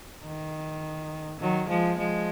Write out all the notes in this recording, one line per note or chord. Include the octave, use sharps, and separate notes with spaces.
D#3
D#3 F#3
F3 G#3
F3 G#3